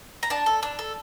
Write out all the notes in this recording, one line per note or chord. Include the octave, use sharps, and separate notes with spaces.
A#5
D4 A5
A4
D4
A4